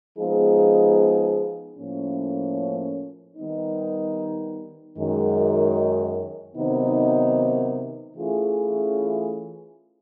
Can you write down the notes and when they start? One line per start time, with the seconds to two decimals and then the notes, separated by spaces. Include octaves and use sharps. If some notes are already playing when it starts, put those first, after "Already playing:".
0.17 F3 G#3 B3 D#4 G#4
1.77 A2 F3 A#3 C#4
3.37 D#3 G3 B3 D#4
4.97 F#2 D#3 G#3
6.57 C3 D#3 F#3 B3 D#4
8.16 E3 A3 C#4 F4 G#4